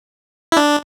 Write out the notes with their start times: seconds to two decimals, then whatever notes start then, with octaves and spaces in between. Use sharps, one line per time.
0.52 E4
0.57 D4